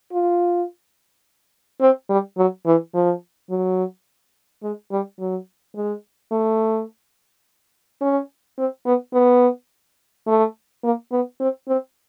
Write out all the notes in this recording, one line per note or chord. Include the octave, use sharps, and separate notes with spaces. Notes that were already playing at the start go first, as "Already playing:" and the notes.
F4
C4
G3
F#3
E3
F3
F#3
G#3
G3
F#3
G#3
A3
C#4
C4
B3
B3
A3
A#3
B3
C4
C4